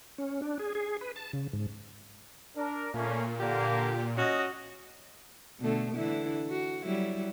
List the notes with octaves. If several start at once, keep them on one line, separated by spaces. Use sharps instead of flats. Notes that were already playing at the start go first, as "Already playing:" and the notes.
C#4
D4
G#4
G#4
B4
A5
C#3
G#2
D4 A#4
A#2 A3 A#3 C#4
D3 A#3 G4
C#4 F#4 D#5
B2 D3 A3
D3 E3 E4
F#4
F#3 G3 E4